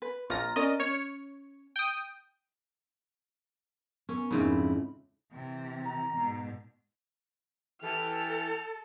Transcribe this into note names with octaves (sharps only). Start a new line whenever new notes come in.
B4
A#1 F4 A#5 A#6
C#4 A#4 D5 D#5
C#4 C#5 C#7
G5 D#6
B3 C#4 A#4 C#6
F2 G#2 C#3 C4 D#4 E4 G#4 B5
C3 E3
A#5
G#2 B2
E3 G4 A4 F6